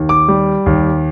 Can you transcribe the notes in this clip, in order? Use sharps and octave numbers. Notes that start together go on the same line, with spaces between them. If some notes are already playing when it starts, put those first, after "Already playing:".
Already playing: D#2
D6
G3
D#2